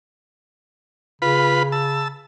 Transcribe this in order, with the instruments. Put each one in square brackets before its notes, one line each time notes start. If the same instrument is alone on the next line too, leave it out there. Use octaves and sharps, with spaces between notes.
[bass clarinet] C#3 [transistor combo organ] F4 B4 B5
[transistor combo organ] A5 E6